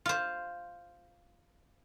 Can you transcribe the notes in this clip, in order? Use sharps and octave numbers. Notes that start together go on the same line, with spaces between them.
F4 C5